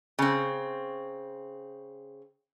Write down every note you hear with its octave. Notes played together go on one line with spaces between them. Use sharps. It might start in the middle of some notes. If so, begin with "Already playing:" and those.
C#3 C4